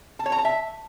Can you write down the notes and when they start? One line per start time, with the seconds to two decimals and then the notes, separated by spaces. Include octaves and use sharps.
0.19 A5
0.26 C#5
0.32 A#5
0.38 A5
0.45 E5